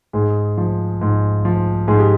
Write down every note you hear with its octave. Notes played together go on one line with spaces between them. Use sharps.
G#2 G#4
F3
G#2
F3
G#2 G#4
G4